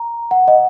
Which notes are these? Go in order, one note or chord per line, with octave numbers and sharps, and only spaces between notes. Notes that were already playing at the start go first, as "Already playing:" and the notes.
Already playing: A#5
F#5
D#5